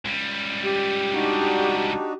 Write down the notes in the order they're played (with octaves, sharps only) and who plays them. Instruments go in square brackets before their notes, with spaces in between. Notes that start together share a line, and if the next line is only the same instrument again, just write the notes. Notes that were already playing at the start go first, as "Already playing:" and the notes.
[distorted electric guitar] C#2 G3
[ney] G4
[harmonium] D4 D#4 F#4